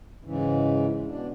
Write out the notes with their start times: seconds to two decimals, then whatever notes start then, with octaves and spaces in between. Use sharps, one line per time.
0.25 G#2 C#3 E3
1.07 B2 D4